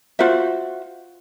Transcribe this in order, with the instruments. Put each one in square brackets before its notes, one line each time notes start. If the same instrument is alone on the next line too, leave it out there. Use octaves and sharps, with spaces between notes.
[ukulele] F4 F#4 C5 E5